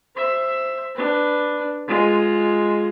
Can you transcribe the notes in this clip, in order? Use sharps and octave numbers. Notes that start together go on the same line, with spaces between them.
C5 E5
D4 B4
G#3 F4